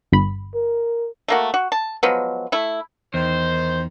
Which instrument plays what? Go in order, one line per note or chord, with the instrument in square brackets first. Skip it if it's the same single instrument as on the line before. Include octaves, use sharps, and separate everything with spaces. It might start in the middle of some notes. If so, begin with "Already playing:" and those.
[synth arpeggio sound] G1 B5
[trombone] A#4
[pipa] A3 A#3 F#4
F#4
A5
F3 F#3 G#3 B3
A3 E4
[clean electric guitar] E2 [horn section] D#3 C5